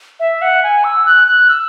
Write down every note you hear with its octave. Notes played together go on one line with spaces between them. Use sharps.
E5
F#5
G#5
E6
F#6
F#6
E6